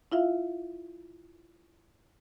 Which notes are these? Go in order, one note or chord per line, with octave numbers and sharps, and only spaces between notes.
E4 F4 E5 F5